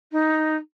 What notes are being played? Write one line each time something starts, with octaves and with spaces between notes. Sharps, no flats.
D#4